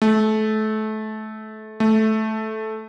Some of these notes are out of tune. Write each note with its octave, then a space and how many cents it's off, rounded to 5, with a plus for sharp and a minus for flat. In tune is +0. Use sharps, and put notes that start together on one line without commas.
A3 -25
A3 -10